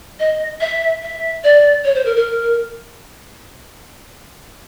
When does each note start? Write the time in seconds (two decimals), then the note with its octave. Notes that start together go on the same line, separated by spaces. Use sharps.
0.20 D#5
0.61 E5
1.02 E5
1.44 D5
1.85 C#5
1.95 C5
2.06 A#4
2.16 A#4